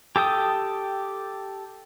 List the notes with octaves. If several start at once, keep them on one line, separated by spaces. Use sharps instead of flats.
G4 A4 G5 D#6